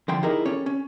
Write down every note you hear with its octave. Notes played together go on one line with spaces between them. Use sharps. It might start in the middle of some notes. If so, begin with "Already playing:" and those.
D3 F3 G5 C6
D#4 E4 G4 G#4 A#4 D#5
C#4 G4 A4 C#5
C#4